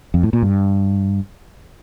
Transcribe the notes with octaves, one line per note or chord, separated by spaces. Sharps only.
F2
A2
A#2
G2